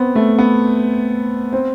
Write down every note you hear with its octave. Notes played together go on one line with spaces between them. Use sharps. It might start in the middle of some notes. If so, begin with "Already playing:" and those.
Already playing: B3 C4
A3
B3
C4